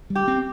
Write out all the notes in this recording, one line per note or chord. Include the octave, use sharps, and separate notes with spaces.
G3
G4
C4